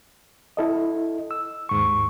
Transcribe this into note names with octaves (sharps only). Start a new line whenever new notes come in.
E4 A4 D#5
E6
D#2 G#2 C#6